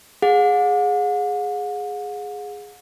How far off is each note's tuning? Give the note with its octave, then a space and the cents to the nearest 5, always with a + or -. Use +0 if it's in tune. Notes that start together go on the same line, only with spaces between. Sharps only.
G#4 +0 F#5 -45